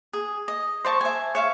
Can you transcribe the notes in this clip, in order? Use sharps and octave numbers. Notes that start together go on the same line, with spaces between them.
G#4
D#5
C5 D5 A5 C#6
E5 G#5
C#5 E5 F5